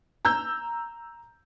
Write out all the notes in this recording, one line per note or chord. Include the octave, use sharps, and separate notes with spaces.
A#5 E6 G6